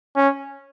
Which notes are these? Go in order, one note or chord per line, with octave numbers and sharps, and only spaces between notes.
C#4